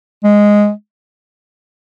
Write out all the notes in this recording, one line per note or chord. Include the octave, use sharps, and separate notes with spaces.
G#3